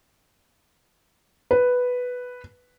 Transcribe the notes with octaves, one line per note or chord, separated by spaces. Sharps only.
B4